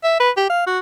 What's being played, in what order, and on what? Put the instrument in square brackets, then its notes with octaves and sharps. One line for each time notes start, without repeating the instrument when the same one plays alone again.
[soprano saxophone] E5
B4
G4
F5
F#4